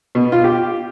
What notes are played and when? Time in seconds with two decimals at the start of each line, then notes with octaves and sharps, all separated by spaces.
0.15 B2
0.32 F4
0.44 G4